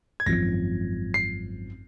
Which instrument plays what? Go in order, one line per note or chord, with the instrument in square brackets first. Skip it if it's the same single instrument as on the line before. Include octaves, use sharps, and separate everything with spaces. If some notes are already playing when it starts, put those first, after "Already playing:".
[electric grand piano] G#6
[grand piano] G#1 F#2 F3 [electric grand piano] A#6
[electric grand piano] C7